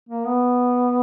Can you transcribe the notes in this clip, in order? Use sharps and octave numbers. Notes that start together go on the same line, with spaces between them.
A#3
B3